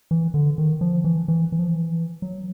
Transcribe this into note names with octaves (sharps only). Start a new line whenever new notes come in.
E3
D3
D#3
F3
E3
E3
E3
F3
E3
F#3